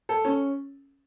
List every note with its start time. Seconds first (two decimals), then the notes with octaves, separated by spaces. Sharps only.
0.09 A4
0.25 C#4